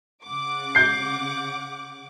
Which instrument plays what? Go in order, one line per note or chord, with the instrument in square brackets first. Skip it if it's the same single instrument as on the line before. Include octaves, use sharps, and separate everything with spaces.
[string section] C#3 F#5 D6
[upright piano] G6 C7